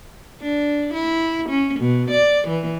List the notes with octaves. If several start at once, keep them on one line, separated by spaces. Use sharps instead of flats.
D4
E4
C#4
B2
D5
E3